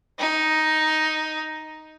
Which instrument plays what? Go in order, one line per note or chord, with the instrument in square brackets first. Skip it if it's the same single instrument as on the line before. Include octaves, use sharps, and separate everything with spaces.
[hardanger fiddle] D#4